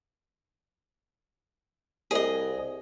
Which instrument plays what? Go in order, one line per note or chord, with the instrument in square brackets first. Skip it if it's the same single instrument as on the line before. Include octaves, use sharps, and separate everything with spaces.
[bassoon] C2 [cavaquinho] G#4 D#5